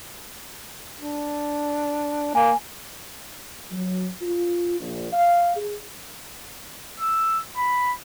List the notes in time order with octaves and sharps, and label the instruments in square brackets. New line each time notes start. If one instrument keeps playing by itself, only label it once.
[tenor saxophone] D4
[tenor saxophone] A#3 [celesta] G#5
[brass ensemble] F#3
F4
A#1
F5
G#4
[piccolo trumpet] E6
B5